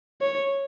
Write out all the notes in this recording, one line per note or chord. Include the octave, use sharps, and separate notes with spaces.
C#5